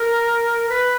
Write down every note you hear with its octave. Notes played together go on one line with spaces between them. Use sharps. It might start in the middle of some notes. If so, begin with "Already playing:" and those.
Already playing: A#4
B4